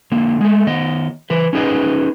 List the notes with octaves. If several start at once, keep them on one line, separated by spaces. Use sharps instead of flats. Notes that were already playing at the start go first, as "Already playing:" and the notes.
D3 A#3
G#3 A3
D#3 B3 D#5
E3 B4 C5
C#4 D#4 G#4 B4 D#5